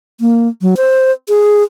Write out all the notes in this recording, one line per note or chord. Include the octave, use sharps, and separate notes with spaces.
A#3
F#3
C5
G#4